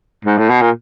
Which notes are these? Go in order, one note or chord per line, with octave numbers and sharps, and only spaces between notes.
G#2
A2
B2
A#2